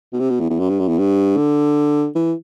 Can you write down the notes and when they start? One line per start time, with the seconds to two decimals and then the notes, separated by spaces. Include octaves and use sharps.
0.13 B2
0.20 C3
0.30 B2
0.40 E2
0.50 E2
0.60 F#2
0.70 G2
0.80 F#2
0.88 E2
0.99 G2
1.37 D3
2.16 E3